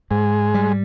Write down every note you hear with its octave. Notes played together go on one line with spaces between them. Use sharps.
G#2 G#3
G3